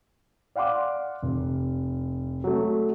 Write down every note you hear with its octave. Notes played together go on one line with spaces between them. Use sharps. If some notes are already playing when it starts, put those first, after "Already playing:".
D5 F5 F#5 C6 D6
F1
F#3 A3